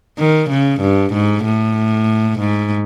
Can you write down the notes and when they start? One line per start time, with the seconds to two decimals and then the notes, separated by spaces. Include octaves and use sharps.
0.19 D#3
0.50 C#3
0.81 G2
1.13 G#2
1.44 A2
2.39 G#2